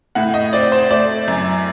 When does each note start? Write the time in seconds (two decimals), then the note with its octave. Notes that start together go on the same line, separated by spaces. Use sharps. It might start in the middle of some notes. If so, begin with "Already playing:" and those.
0.15 A2 F#5
0.34 D#5
0.53 C4 D5
0.72 C5
0.91 A3 D5
1.28 F#2